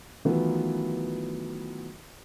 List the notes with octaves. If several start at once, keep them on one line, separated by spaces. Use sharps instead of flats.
D#3 E3 F#3 A3 B3 F4